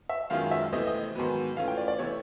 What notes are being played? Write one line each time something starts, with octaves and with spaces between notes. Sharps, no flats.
E5
F#2 D#3 G#3 C#4 F4 F5
E5
C3 E3 A3 C4 D#5
D#5
G#2 D#3 F#3 B3
E3 A3 C#4 F4 F5
G5
D5
D5
C3 E3 A3 C#5